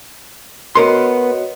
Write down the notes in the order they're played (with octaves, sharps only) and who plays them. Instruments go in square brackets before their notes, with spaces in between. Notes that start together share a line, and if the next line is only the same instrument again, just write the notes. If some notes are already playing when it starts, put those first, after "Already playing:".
[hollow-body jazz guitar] B3 A#4 C6 [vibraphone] F#4 C#5 D#5